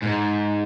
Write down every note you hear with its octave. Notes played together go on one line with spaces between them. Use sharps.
G#2